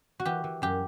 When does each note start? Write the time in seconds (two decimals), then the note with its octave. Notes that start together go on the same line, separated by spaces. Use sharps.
0.20 F#4
0.25 E3 G4
0.44 E3
0.62 F#2 G4